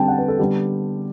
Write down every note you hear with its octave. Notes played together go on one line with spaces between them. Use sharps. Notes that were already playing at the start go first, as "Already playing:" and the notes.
Already playing: D3 G3 C4 G5 A5
F#5
B4
A4
D3 G3 B3 G4